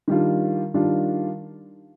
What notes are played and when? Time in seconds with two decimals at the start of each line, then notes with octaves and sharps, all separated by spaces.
0.08 D#3 G3 D4 F4
0.74 D#3 G3 D4 F4